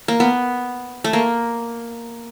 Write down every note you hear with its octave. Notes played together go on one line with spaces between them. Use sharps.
A#3
B3
A3
A#3